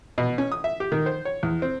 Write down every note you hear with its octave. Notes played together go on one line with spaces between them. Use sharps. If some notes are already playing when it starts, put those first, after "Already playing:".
B2
C#4
D#6
E5
G4
D#3
C5
C#5
E2
C4